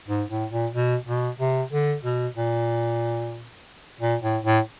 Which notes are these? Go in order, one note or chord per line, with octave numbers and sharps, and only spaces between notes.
G#2
A2
A#2
B2
B2
C3
D3
B2
A#2
A#2
A2
A2